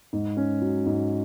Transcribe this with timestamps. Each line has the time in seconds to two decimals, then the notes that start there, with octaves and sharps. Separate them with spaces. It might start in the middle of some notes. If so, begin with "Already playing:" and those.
0.13 G#2
0.37 C#4
0.62 F#3
0.86 G#2